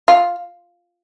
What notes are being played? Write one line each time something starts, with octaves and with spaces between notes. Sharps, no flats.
F4